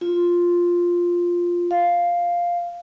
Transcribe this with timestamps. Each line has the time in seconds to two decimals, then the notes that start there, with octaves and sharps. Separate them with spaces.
0.01 F4
1.71 F5